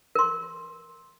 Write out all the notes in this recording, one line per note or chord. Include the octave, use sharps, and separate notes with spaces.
A#4 C6